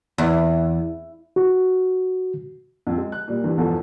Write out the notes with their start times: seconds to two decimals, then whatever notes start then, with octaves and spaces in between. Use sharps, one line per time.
0.18 E2
1.36 F#4
2.87 F2
2.98 G#3
3.12 F#6
3.28 A#2 G3
3.44 G2 E3
3.57 E2 B2 F3 A3